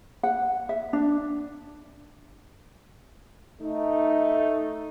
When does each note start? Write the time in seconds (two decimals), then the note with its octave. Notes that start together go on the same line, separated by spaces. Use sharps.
0.23 F#5
0.69 E5
0.93 D4
3.61 A3 D#4